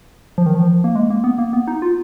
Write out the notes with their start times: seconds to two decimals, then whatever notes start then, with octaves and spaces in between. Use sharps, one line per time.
0.38 F3
0.46 D#3
0.55 F3
0.84 A#3
0.95 G#3
1.10 A#3
1.24 B3
1.38 A#3
1.53 B3
1.67 D#4
1.82 F4